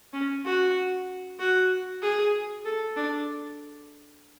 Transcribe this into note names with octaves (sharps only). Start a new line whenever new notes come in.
C#4
F#4
F#4
G#4
A4
D4